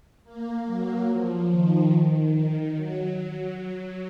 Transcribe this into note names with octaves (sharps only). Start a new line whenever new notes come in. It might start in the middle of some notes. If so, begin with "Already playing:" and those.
A#3
F#3
F3
D#3
D#3
F#3
F#3